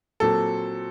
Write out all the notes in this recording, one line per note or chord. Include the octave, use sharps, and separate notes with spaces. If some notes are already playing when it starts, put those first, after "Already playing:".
A#2 F#3 C4 A4